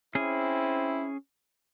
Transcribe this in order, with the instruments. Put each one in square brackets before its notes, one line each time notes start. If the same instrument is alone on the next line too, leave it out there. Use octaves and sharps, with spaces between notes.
[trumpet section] C4 E4 [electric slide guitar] C#4 G#4